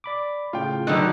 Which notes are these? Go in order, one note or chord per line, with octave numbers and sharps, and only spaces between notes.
D5 B5 D6
A2 C#3 F4 G5
B2 D3 D#3 F#3 F#6